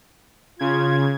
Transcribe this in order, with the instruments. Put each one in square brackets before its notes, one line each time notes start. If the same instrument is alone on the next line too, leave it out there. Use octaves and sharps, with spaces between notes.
[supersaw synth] C#3 G#6 [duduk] F4